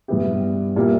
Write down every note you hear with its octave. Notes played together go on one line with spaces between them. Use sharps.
G2 G3 B3 E4 G4
A#2 G3 A#3 E4